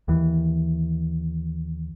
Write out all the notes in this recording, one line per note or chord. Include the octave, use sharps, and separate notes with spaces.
D#2 E3